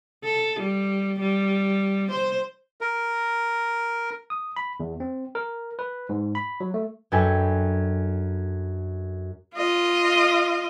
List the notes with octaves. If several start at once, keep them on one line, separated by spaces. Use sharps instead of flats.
A4
G3
G3
C5
A#4
D#6
B5
E2
C4
A#4
B4
G#2
B5
F#3
A3
F#2 D4 A4 B4 G5 G#5
F4 D#5